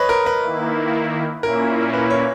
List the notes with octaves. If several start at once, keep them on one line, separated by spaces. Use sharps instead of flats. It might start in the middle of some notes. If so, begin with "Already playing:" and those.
Already playing: B4 C#5 D#5
A#4
B4
D#3 A#3 E4
A#2 A#3 C#4 E4 A#4
B4
C#5